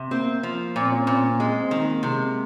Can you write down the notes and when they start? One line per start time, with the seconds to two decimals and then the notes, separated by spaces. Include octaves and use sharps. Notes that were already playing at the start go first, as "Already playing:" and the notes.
Already playing: C3
0.11 A#3 C4
0.43 F3
0.76 A#2 C4
0.91 C#4
1.07 A#2 C4
1.24 C4
1.39 G#3 C4
1.61 C4
1.71 D#3
1.82 A#3
2.03 C3 G#3